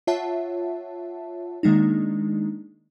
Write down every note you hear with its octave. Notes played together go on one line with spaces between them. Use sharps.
F4 C#5 E5 F#5 A5
D#3 G#3 A#3 D4 D#4